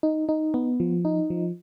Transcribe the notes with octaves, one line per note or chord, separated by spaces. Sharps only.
D#4
D#4
B3
F3
D#4
F3